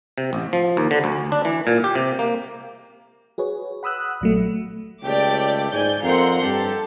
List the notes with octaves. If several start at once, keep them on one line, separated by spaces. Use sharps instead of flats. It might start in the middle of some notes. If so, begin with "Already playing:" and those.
C3
A1
F3
D#2
D3
D2
D4
E3
A#2
G4
C3
A#3
F#4 G#4 B4 C#5
F#5 B5 D#6 E6 F#6
A#1 F#3 A3
C#2 A3 G4 D5 G5 D6
G#2 D5 G#5 G6
F2 C4 A#4 F5 F#5 C6
G2 G4 A4